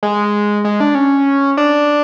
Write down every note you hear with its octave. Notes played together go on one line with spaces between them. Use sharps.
G#3
G#3
D4
C#4
D4